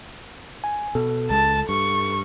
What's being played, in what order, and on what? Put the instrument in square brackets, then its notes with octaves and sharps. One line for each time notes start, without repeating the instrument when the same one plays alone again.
[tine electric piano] G#5
[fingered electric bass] B2 [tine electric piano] A4
[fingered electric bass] C#2 G#3 [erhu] A5
[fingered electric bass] G2 [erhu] C#6